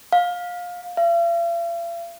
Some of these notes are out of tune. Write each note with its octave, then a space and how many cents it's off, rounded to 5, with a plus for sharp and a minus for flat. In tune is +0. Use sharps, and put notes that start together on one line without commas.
F5 +20
F5 -45